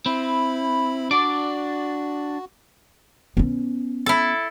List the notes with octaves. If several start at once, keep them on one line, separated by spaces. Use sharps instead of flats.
C4 E4 B5
D4 F#4 D5 D6
B3 C#4
E4 A4